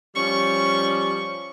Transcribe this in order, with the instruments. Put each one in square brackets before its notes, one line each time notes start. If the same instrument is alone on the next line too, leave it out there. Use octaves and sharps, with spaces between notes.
[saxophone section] F3 G3 C#4 [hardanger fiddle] C#6